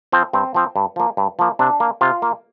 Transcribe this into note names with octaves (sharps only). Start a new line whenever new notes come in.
F3 C4
G2 C4
F3 C4
G2
F3 A#3
G2
F3 A#3
C3 D4
A#3
C3 F4
A#3